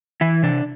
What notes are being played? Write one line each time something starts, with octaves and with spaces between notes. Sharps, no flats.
E3 E4
C3 D4